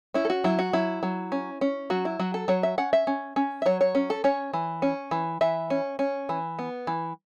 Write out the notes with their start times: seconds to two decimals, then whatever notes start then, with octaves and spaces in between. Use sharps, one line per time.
0.14 C#4 E4
0.25 A4
0.30 F#4
0.44 F#3 E4
0.59 F#4
0.73 F#3 E4
1.03 F#3
1.32 C#4
1.61 C#4
1.90 F#3 F#4
2.05 E4
2.19 F#3 F#4
2.34 A4
2.48 F#3 C#5
2.63 E5
2.78 C#4 F#5
2.93 E5
3.07 C#4
3.36 C#4
3.62 E5
3.66 F#3 C#5
3.81 C#5
3.95 C#4
4.10 A4
4.24 C#4 C#5
4.53 E3
4.82 C#4
5.11 E3
5.41 E3 E5
5.70 C#4
5.99 C#4
6.29 E3
6.59 B3
6.87 E3